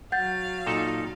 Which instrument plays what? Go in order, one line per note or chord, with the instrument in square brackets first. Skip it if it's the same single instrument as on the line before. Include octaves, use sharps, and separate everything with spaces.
[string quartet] F#3 F5 [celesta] F#5 G6 A6
[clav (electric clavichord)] A#2 D#4 A4